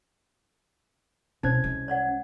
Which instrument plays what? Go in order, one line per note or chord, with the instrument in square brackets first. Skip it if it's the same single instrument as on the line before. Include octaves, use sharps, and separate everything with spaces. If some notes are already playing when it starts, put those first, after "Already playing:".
[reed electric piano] C2 C#4 G#6 [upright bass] B2 [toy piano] D#4 C5
[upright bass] G#3
[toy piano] C#5 D5 F#5